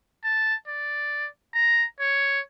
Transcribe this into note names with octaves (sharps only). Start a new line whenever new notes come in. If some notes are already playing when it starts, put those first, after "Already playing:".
A5
D5
A#5
C#5